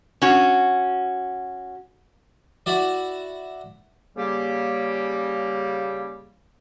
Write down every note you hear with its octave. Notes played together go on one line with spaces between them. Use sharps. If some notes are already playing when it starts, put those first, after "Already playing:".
C#4 F#4
E4 F#4 D5
C#3 G3 A#3 G4